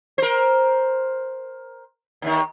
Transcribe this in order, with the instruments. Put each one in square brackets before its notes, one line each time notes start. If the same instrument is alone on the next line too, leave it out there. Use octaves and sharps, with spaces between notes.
[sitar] A#4 C5
D#2 D#3